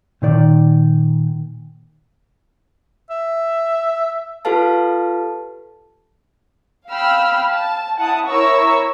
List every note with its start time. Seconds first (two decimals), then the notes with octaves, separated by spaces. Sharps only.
0.22 A#2 D#3 D5
3.10 E5
4.45 F4 G4 A4 B4 F5 A5
6.89 F5 G5 B5 E6 F6
7.51 A5
7.98 E4 F#5 A5 D#6
8.27 E4 A#4 C#5 A#5 C#6 E6